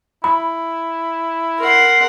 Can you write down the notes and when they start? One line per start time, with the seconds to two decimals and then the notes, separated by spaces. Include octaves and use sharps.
0.24 E4 B5
1.59 A#4 F#5 C6